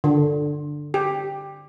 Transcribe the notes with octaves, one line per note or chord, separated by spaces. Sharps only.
D3
G4